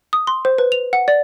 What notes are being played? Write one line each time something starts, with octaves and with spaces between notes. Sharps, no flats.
D#6
C6
C5
B4
F7
F#5
D5